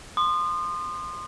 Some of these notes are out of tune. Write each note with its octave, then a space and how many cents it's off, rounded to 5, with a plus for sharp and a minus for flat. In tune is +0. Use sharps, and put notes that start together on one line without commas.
C6 +0 D#6 -35